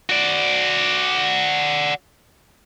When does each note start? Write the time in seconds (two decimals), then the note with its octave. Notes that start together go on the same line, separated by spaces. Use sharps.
0.09 F#4 D5